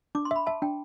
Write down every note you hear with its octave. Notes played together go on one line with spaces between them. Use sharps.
D4 D6
C6
E5 B5
E5 A5
D4 G5